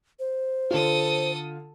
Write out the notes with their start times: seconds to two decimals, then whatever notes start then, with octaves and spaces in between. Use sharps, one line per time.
0.19 C5
0.71 D3 F4 A4 D#6